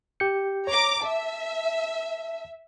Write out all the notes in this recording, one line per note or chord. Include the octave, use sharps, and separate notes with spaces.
G4 G6 C#7
C#5 A#5 D6
E5 A5